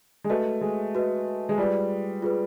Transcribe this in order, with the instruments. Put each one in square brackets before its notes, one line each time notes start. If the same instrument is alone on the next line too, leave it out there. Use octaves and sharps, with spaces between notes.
[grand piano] G#3
[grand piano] A3 [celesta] F#4 B4 D#5
[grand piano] G#3
[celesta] F#4 B4 D#5
[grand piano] G#3
[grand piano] G3 [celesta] F4 G#4 B4
[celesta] F4 G#4 B4